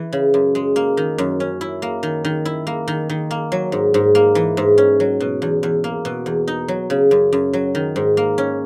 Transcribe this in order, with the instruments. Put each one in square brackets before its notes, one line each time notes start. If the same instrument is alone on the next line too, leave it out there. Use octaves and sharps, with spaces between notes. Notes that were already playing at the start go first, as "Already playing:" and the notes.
Already playing: [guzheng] E3
C#3
F#2
G#3
A#3
D#3
F#2
C#4
E4
A#3
D#3
D#3
E4
A#3
D#3
D#3
A#3
F#3
G#2
G#2
A#3
E3
G#2
C#4
F#3
B2
E2
E2
A#3
B2
E2
D#4
F#3
C#3
F#2
F#2
F#3
D#3
G#2
A#3
C#4